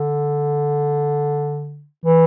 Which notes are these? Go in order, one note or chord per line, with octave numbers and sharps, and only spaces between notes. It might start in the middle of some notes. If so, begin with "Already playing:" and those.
Already playing: D3
E3